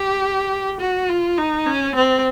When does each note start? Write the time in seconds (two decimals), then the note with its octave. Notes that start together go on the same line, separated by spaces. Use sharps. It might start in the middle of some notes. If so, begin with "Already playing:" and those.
Already playing: G4
0.81 F#4
1.09 F4
1.38 D#4
1.66 C#4
1.96 C4